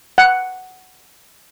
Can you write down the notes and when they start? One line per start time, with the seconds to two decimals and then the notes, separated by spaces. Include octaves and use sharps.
0.18 F#5